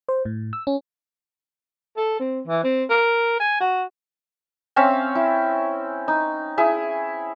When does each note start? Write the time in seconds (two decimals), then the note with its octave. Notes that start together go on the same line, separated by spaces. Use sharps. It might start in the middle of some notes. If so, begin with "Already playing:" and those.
0.09 C5
0.25 A2
0.53 E6
0.67 C#4
1.97 A4
2.20 C4
2.47 E3
2.64 C4
2.90 A#4
3.40 G#5
3.60 F#4
4.76 C4 C#4 E5 F5
5.15 E4
6.08 D#4
6.58 E4 G#4